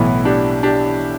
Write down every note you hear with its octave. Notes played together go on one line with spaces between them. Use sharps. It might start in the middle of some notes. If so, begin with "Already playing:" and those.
Already playing: B1 A2 E3 B3 E4
D4 G4
D4 G4